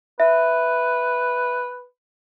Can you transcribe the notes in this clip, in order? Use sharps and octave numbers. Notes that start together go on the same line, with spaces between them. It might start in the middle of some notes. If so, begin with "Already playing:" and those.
B4 E5